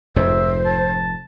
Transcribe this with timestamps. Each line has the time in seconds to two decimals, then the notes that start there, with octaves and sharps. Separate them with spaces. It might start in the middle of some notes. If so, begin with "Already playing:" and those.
0.16 F1 F2 G#2 C5 E5
0.65 A5